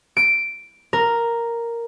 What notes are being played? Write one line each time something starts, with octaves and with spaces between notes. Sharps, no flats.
D7
A#4